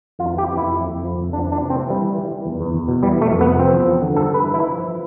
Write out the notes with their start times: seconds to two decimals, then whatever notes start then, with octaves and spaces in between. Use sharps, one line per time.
0.19 F2 F4
0.33 E3 G4
0.47 F2
0.57 E4
0.63 F2
0.76 F2
0.90 F2
1.05 F3
1.18 F2
1.33 F2 D4
1.47 E3 D4
1.62 C3
1.70 C4
1.75 E3
1.90 E3 G3
2.04 E3
2.18 E3
2.31 E3
2.46 E2
2.59 E2
2.75 E2
2.88 B2
3.03 E3 G3
3.16 E3
3.21 A3
3.31 F2
3.41 B3
3.44 C3
3.59 F3 C4
3.73 E2
3.88 F3
4.02 D3
4.15 G2 A4
4.30 G2 B4
4.44 E3
4.54 E4
4.58 E3
4.72 F3